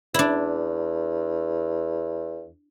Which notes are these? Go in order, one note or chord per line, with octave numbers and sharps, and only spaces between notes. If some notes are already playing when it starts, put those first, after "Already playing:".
E2 D4 E4